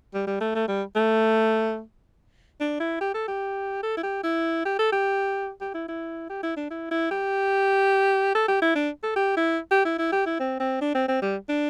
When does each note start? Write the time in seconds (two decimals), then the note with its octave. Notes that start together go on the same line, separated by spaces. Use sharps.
0.14 G3
0.27 G3
0.41 A3
0.55 A3
0.68 G3
0.96 A3
2.60 D4
2.80 E4
3.01 G4
3.14 A4
3.28 G4
3.83 A4
3.97 E4
4.03 G4
4.24 E4
4.65 G4
4.79 A4
4.92 G4
5.61 G4
5.74 E4
5.88 E4
6.30 G4
6.43 E4
6.57 D4
6.70 E4
6.91 E4
7.11 G4
8.35 A4
8.48 G4
8.62 E4
8.75 D4
9.03 A4
9.16 G4
9.37 E4
9.71 G4
9.85 E4
9.99 E4
10.12 G4
10.26 E4
10.40 C4
10.60 C4
10.81 D4
10.95 C4
11.08 C4
11.22 G3
11.49 D4